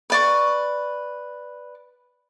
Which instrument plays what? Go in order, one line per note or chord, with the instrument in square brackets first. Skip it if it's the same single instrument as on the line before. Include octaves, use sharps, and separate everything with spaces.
[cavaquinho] B4 D5 C#6